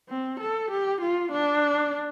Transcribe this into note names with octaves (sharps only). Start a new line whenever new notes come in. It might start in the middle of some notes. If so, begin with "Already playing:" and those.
C4
A4
G4
F4
D4